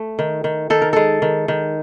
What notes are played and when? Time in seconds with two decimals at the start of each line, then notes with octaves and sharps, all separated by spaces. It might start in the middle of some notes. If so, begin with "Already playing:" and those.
Already playing: A3
0.19 D#3
0.44 D#3
0.70 D#3 A4
0.82 A#4
0.93 G#3 A4
1.22 D#3
1.48 D#3